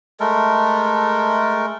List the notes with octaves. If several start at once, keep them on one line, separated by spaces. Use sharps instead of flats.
G#3 A3 A4 A#4